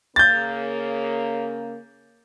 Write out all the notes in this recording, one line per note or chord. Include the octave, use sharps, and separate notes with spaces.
C#3 A#3 G6 A6